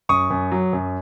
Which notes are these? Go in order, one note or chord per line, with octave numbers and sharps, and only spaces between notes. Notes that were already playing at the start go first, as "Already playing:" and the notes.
F#2 C#6 D#6
F#2
F#3
F#2